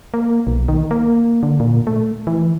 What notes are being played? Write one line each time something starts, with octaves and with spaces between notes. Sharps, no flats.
A#3
B1
D#3
A#3
D3
A#2
A3
E3